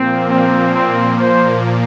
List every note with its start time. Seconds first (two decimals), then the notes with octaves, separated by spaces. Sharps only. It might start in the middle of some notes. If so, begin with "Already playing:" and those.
Already playing: A#2 F3 A#3 C4
0.30 C4
0.75 C4
1.19 C5